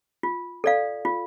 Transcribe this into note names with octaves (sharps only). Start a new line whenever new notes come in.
F4
A4 D5 F5
F4